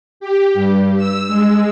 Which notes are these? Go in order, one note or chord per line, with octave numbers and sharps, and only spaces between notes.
G4
G2
E6
G#3